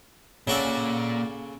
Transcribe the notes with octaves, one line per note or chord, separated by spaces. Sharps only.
A#2 C#3 F#4 A4 D5